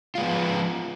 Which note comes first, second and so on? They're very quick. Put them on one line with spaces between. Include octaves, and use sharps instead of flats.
F4 G#3 B3 F3